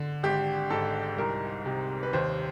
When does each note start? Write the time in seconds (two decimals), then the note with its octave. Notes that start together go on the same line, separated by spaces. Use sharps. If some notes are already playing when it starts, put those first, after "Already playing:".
Already playing: D3
0.23 G#1 G4
0.70 G#2 A4
1.18 C2 A#4
1.66 C3
2.03 B4
2.13 D#2 C5